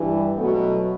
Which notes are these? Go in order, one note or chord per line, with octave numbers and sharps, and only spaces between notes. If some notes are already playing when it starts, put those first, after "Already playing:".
Already playing: G2 E3 G3
B2 F#3 A3 B3